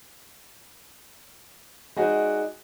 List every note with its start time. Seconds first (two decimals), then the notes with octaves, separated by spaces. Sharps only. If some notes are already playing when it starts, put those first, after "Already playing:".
1.96 G#3 D#4 F#4 D5 F#5